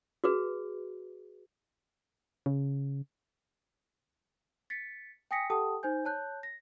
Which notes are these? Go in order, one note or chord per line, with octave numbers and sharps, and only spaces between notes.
F#4 G#4 B4
C#3
A6 B6 C#7
G5 G#5 D#6 A#6 B6 C#7
G4 A4 F#5 G5 A5 D#6
D#4 C5 G#5 G6
C#5 A5 F#6 G6
A#6